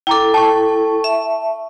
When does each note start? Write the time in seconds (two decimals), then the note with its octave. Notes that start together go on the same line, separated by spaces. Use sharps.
0.07 E4 A4 G5 A#5 D6
0.34 G5 A5 C#6
1.04 E5